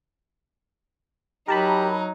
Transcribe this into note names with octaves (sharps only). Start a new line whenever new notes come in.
F#3 D#4 G4 A#4 A5 B5